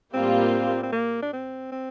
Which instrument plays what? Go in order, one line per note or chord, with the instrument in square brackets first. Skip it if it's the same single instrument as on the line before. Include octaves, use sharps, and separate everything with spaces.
[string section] A2 G3 A#3 F4 [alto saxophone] C4
[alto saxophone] C4
A#3
D4
C4
C4